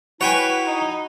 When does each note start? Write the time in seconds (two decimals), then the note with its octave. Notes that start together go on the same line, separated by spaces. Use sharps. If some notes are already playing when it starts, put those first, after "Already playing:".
0.21 E4 F#4 B4 C#5 G5 G#5
0.66 D#4